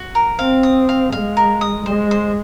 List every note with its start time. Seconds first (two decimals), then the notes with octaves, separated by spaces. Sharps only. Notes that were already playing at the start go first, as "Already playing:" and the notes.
Already playing: F#4
0.15 A#4
0.39 C4 F5
0.63 D#6
0.89 F5
1.12 G#3 F5
1.37 A#4
1.61 D#6
1.86 G#3 C5
2.11 C5